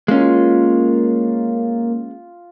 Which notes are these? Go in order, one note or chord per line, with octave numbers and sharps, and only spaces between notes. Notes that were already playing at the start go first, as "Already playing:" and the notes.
G#3 A#3 C#4 F4